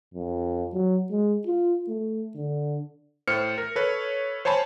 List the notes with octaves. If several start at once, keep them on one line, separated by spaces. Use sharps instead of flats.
F2
F#3
G#3
F4
A3
D3
A2 C5 F6 C#7
A#4
A4 B4 C#5
C5 C#5 G#5 A5 B5